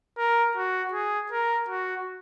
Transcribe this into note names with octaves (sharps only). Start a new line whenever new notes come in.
A#4
F#4
G#4
A#4
F#4